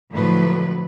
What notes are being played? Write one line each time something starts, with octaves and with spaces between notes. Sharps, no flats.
A2 D3 F3 F#3 B4